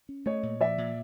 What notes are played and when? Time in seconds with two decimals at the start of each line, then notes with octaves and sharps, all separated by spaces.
0.09 C#4
0.26 A3 C#5 D#5
0.43 A#2
0.60 F3 D5 E5
0.78 A#2